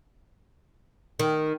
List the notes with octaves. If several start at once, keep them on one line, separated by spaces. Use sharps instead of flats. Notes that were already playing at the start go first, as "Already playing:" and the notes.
D#3